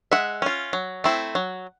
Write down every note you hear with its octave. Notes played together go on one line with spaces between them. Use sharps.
G#3 E5 F#5
C#4 F4
F#3
A3 C4 E4
F#3